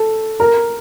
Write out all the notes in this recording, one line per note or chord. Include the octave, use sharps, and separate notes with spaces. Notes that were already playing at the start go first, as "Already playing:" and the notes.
Already playing: A4
A#4